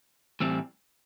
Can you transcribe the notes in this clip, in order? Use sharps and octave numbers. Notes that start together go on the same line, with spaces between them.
A2 E3 G3 C4